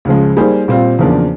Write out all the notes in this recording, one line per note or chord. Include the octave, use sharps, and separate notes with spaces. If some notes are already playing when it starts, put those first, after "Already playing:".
C#2 C#3 F3 G#3
G3 A#3 D#4 G#4 C5
A#2 G3 C4 F4
E2 C#3 F3 A#3 D4